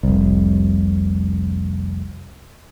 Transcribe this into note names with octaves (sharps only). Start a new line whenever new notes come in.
F1 C2